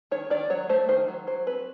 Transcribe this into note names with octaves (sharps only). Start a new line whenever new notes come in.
D#3 C#5
D#3 D5
F#3 C#5
A3 C5
D#3 C5
F#3
F#3 C5
C4 B4